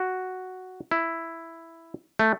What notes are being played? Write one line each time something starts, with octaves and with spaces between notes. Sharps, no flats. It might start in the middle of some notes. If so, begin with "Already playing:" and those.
Already playing: F#4
E4
A3